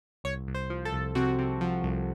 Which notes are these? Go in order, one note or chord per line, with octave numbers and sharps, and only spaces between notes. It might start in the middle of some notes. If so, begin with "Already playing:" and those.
C2 C#5
C2
C5
F3
A4
C2
C3 F#4
C3
F3
C2